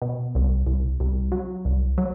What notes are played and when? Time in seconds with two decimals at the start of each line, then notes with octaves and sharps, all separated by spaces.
0.02 B2
0.35 C2
0.67 C2
1.00 C2
1.32 F#3
1.65 C2
1.98 F#3